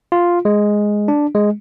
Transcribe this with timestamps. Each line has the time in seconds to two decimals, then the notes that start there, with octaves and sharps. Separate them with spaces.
0.12 F4
0.45 G#3
1.08 D4
1.35 G#3